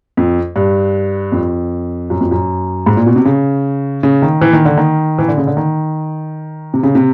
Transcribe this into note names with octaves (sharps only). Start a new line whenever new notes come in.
F2
G2
F2
F#2
F2
F#2
G#2
A#2
B2
C3
C#3
C#3
D#3
E3
D#3
D3
D#3
E3
D3
C#3
D3
D#3
C3
C#3
C3